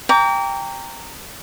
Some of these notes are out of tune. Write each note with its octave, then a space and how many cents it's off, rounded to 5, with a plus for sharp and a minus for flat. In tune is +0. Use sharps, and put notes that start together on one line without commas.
G5 +15 A#5 -15 D6 -40